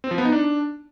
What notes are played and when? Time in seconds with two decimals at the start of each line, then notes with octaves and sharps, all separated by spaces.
0.04 C4
0.11 F3
0.18 B3
0.25 D#4
0.32 D4